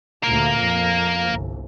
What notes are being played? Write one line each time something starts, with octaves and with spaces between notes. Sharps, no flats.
D2 A#2 A#3 A#4
F2
G1 C2